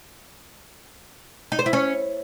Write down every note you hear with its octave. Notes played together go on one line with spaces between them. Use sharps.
D#4
C5
E4
C#4